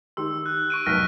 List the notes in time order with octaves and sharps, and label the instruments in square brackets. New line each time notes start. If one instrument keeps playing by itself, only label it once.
[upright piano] D#3 G4 C6 [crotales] E6
[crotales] F#6
C#6 D7 D#7
[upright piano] F1 B1 B6 [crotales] F6 F#6 A#6